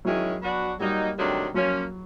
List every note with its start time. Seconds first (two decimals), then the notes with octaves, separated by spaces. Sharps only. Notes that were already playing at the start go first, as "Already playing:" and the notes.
0.04 D#3 F#3 G#3 C#4 E4
0.42 B3 D4 F#4
0.80 F#3 G3 A#3 D#4
1.17 C3 D#3 F#3 A3 D4
1.54 F3 F#3 A#3 C#4